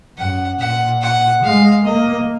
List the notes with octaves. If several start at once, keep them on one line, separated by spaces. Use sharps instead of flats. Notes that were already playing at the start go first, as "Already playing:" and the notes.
F#2 F#5
A#2 F#5
F#5
G#3 F5
A#3 D#5